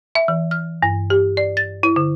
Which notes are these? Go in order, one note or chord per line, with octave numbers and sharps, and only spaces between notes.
E5
E3
F6
G2
G4
D5
A6
E4
D3